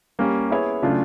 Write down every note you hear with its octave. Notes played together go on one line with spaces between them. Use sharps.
G3 A#3 C#4
B3 E4 G#4 C#5
C#3 F#3 A3 D4 F4